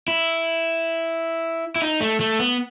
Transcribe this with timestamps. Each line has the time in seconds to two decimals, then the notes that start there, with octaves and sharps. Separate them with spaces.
0.08 E4
1.76 E4
1.82 D#4
2.00 A3
2.20 A3
2.39 B3